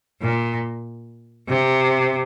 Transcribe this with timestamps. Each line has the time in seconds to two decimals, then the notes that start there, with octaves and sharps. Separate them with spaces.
0.22 A#2
1.49 C3